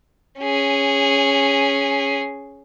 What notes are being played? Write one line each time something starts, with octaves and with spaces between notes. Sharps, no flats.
C#4 G#4